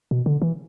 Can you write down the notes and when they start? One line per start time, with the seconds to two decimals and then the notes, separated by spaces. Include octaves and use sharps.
0.11 B2
0.26 D3
0.42 E3